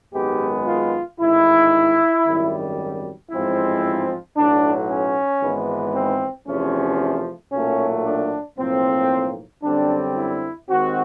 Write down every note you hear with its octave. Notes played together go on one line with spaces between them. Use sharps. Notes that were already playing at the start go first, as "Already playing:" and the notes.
G#1 F#2 D#3 G#3 B3 G4
F4
A1 G#2 D#3 E4
G#1 F#2 D#3 G3
A1 G#2 F3 G#3 C4 E4
B1 A2 F#3 D4
C#4
G#1 G#2 E3 G#3 B3
C4
E2 C3 F3 A3 C#4
B1 A#2 F#3 A3 C#4
D4
B1 A2 F3 A#3 C4
F#2 D3 G3 C4 D4
E4
D#2 D#3 G#3 C4 F#4